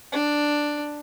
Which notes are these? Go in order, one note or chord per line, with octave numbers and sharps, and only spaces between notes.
D4